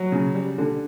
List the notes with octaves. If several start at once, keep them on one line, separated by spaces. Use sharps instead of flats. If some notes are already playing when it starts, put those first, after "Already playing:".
Already playing: F#3
C#3
G3
D3